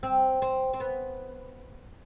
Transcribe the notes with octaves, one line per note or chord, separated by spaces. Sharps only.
C4
C4
C4
B3